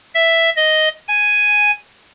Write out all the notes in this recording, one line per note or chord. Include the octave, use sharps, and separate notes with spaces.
E5
D#5
G#5